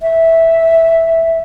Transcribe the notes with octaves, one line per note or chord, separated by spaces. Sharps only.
E5